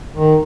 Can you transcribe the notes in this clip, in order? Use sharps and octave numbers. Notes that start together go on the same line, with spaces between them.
D#3